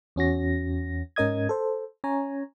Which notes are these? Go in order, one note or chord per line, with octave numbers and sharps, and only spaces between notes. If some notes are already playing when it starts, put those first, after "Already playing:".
E2 C#4 F#4 A#6
G#2 C#4 A#4 D#5 D#6 G#6
A4 C5
C#4 C#5 G#5 A#5